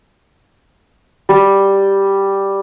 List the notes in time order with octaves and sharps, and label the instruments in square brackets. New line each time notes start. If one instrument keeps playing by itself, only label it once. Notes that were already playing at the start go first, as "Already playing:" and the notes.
[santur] G3